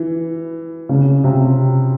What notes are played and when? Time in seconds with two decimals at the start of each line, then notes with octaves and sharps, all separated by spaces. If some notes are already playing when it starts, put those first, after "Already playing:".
Already playing: E3
0.89 C#3
1.24 C3